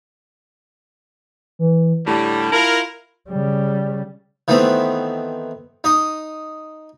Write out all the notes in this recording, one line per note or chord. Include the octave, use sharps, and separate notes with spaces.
E3
A2 D3 G3 A5
E4 F4 A#4
C#3 G3
D#3 E3 A3 B3 C4
D#4 D#5